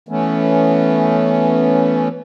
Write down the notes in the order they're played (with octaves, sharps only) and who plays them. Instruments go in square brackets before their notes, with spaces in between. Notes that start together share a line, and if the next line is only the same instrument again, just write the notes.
[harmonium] E3 A3 B3 C#4